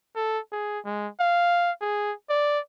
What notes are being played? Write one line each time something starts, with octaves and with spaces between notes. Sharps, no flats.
A4
G#4
G#3
F5
G#4
D5